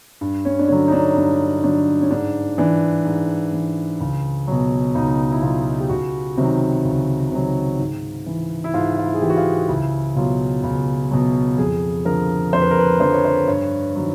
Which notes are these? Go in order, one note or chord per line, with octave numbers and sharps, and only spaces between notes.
G2
C#4
D4
D3 F#3 C#4
D#4
D4
G2 C#4
D3 F#3 D4
C#4
G#2 D4
E3 D4
G#2
E3
C#2
B2 F#3
C#2 D#4
E4
B2 F#3 F4
G4
C#2 F#4
C3 D#3 F#3
C#2
C3 D#3 F#3
G#2
E3
E4
G#2 F4
F4
E4
G#4
E3 G4
F#4
F4
C#2 E4
B2 F#3 F4
C#2
B2 F#3
F2 G#4
D3 F3 A#4
F2 C5
B4
A#4
B4
D3 F3 C5
C#5
C5
G2 C#5
D#3 F#3